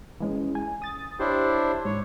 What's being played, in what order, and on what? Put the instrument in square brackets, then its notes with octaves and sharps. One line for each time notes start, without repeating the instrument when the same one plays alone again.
[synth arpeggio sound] E3 G#3 C#4
G#5
D#6 A6
[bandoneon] D4 E4 C5 [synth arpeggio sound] G4 C#5
[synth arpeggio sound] G#2 [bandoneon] C#5